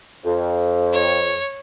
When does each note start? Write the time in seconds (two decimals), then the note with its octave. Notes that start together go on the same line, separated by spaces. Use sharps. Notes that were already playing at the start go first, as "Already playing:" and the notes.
0.24 F2
0.93 C#5